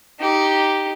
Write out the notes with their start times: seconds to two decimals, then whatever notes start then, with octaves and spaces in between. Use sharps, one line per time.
0.20 D#4 G4